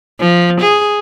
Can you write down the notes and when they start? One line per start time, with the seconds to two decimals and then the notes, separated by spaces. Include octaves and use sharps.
0.20 F3
0.61 G#4